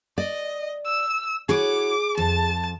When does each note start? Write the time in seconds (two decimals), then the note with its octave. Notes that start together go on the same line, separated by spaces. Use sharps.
0.18 D5 D#5
0.85 E6
1.49 E4 F#4 G#4 C#5 D6
2.17 F2 A5